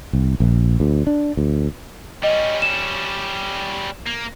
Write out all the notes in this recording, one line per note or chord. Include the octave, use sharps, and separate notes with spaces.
C2
A#1
D2
D4
D2
G3 C#4 D#5
E7
A#3